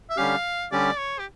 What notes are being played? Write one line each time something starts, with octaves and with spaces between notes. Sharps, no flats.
E5
D3 G3 C#4 G4 F5
D3 G3 C#4 G4 D5
C#5
G4